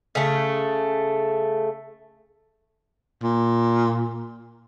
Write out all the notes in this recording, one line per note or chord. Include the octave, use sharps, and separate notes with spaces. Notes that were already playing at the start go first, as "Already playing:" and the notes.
C#3 A3
A#2